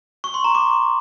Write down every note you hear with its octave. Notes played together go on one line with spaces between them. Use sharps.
C#6
C6
A#5
D6